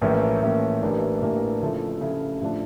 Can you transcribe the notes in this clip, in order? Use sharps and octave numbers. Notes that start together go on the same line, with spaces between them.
A#1 A2 E3 A#3 C#4
A#1 A2 E3 A#3 C#4
A1 A2 E3 A#3 D4
A1 A2 E3 A#3 D4
C#3 F3 A3 E4 A4
C#3 F3 A3 E4 A4
A2 F3 A3 D4